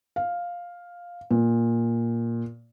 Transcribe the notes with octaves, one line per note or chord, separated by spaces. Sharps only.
F5
A#2